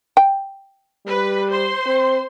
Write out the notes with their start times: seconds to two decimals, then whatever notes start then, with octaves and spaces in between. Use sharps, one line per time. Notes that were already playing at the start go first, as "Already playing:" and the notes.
0.17 G5
1.06 G3 B4
1.48 C5 C6
1.86 C4